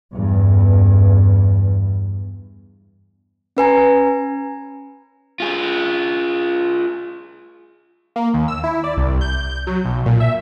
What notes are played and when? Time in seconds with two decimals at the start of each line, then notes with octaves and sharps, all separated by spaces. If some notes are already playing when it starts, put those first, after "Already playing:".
0.12 E2 G2
3.57 C#4 B4 G#5 A#5
5.40 F4 G#4
8.16 A#3
8.34 D#2
8.48 E6
8.64 E4
8.84 D5
8.97 C2
9.21 G6
9.67 F#3
9.85 B1
10.06 A#2
10.20 E5